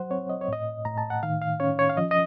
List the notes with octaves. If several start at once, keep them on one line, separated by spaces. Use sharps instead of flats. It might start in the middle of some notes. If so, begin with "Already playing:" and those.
Already playing: F#3 C5 F#5
C4 C#5
D#5
C#5
A2 D#5
A2 A#5
A5
F#5
D#3 F5
F5
C#4 C#5
C#5
F5
F3 D#5
D#5